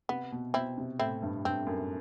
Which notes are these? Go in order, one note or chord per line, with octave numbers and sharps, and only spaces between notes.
C3 B3
B2
B2 C4 E4
C3
A2 C4 E4
G2
G2 C4
F#2